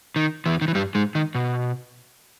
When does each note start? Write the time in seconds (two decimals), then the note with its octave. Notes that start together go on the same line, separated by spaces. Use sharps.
0.16 D#3
0.46 E2 E3
0.61 D#3
0.68 E3
0.75 G2 G3
0.95 G#2 G#3
1.15 D#3
1.35 B2